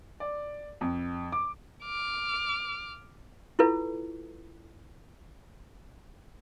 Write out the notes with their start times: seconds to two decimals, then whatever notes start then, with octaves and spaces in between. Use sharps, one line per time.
0.20 D5
0.81 F2
1.32 D6
1.84 D6 F6
3.59 E4 F4 A4 B4